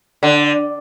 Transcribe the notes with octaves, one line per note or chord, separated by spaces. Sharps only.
D3